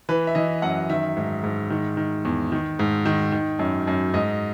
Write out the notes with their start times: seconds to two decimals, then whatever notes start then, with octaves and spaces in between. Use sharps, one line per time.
0.09 E3 B4
0.27 E5
0.35 E3 D#5
0.62 F#2 F#5
0.90 D#3 E5
1.17 G#2
1.44 G#2
1.70 D#3
1.97 D#3
2.25 E2
2.52 D#3
2.79 G#2
3.06 D#3
3.32 D#3
3.59 F#2
3.87 F#2
4.14 G#2 D#5